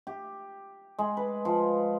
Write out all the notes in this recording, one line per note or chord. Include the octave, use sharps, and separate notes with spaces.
G4
G#3
B4
F3